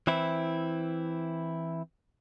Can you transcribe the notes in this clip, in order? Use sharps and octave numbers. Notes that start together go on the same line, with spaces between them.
E3 C4 E4